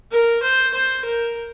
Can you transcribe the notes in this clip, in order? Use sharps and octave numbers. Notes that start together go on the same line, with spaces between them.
A#4
C5
C5
A#4